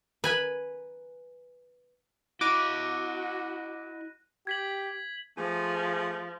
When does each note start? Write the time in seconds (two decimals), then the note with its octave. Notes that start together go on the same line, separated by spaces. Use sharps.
0.24 B4 G#5 B5
2.41 E4 F#4 D#5 D6 F#6 A#6 D#7
4.47 G4 G#6 B6 F#7
5.38 F3 A3 G4 G#4